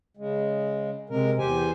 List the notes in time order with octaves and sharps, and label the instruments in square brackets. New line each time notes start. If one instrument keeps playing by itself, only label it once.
[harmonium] C#3 G#3
[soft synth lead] C3 [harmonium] G#3 A#4
[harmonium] E2 C5 G#5 [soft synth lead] G4